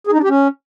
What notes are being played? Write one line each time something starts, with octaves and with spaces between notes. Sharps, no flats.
G#4
D#4
D4
G4
C#4